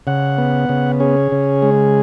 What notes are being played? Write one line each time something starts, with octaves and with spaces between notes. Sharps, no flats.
C#3 F#5
B3
C#3
C#4 G#4
C#3
G#3